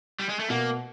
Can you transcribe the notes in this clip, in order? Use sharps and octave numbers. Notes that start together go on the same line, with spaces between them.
G3
G#3
A3
B2 A#3